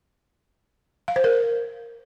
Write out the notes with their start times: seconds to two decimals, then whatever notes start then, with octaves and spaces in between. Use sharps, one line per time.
1.08 F5
1.16 C5
1.24 A#4